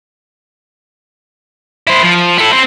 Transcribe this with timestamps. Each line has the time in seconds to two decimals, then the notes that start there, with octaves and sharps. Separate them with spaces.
1.87 E4 C5
2.03 F3
2.38 E4 A4
2.53 C4 C5